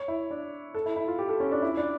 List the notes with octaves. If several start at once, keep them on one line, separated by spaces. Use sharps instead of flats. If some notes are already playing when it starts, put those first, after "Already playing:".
Already playing: C#5
E4
D4
A4
E4
E4
F4
G4
A4
C#4
D4
E4
D4